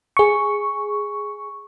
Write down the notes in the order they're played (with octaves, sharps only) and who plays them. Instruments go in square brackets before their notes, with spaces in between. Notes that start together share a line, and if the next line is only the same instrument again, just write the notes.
[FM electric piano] G#4 C#6